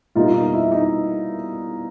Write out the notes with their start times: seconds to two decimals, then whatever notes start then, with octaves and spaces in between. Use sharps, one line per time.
0.15 B2 G3 A#3 D#4 F4
0.34 D#4
0.54 E4
0.72 D#4